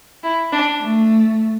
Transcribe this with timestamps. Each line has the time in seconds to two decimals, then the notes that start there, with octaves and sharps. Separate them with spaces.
0.22 E4
0.51 D4
0.81 A3